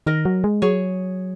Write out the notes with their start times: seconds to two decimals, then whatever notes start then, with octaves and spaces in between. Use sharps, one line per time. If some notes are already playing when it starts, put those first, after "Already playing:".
0.06 D#3 A#4 D#5
0.25 F#3
0.44 G#3
0.62 F#3 G#4 C#5